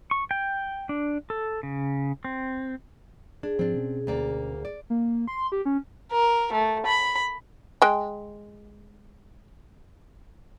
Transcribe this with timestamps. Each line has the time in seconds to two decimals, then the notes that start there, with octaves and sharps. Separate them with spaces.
0.11 C#6
0.31 G5
0.89 D4
1.30 A4
1.63 C#3
2.25 C4
3.43 D4 G#4
3.59 G#2 F3 C4 D4
3.74 B2 C#4
4.07 D2 A#3 D5
4.65 D5
4.90 A#3
5.28 C6
5.52 G4
5.65 C#4
6.11 A#4
6.52 A3
6.86 B5
7.82 G#3 G5